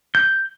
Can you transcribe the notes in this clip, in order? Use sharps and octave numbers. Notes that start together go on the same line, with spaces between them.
G6